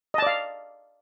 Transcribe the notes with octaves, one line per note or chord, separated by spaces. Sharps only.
D5 D#5 F5 A5